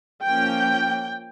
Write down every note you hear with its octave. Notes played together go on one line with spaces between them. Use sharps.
F3 A#3 C#4 G5